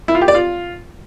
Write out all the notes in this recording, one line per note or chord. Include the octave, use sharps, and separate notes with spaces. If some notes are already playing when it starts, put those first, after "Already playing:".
E4
F4
G4
D5
F4